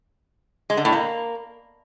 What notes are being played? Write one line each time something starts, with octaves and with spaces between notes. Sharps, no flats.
G#3
D3
A2
A#3